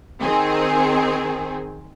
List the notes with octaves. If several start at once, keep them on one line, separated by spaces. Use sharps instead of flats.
D#3 C4 G#4